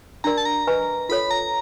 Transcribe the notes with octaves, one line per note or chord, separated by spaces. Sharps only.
D4 F#4 A#4 D5 A#5
A5
A#5
B4 D#5 G#5 C#6
F4 A4 C#5 B5
A#5